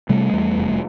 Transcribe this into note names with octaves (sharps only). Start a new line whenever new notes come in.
C3 G3 A3
E2
F1